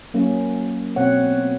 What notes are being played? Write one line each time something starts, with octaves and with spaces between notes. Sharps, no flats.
F#3 A#3 C#4
B2 C4 C#5 F#5